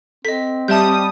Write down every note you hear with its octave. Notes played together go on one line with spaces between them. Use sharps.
C4 A4 D#5 B6
G3 G4 E5 A5 D#6 G6